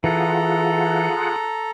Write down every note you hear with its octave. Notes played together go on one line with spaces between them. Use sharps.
E3 F4 G#4 A4 F#5 A#5